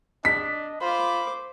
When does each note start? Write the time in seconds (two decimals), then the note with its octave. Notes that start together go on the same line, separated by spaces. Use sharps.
0.25 D4 D#5 B6
0.81 F4 C5 B5 D6